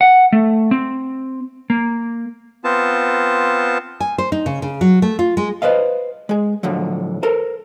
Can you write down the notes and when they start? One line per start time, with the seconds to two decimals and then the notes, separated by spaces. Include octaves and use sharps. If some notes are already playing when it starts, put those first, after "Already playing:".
0.01 F#5
0.32 A3
0.71 C4
1.70 A#3
2.64 B3 C4 F4 A5
4.00 G#5
4.18 C5
4.32 D#4
4.46 C#3
4.62 C#3
4.81 F#3
5.02 A3
5.19 F4
5.37 G#3
5.62 B4 C5 D#5 F5
6.29 G#3 G#4
6.63 A2 D3 F3 F#3
7.23 A4 A#4 C5